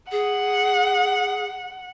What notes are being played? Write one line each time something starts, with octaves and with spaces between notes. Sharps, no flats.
G#4 F#5